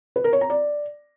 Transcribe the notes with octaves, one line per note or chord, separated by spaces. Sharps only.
B4
A#4
C#5
A#5
D5